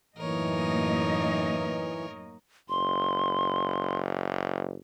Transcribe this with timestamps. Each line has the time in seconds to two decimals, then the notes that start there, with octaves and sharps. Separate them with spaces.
0.18 F#2 A2 E3 A#3 D#4 A#4 C#5 D#5
2.69 F#1 C6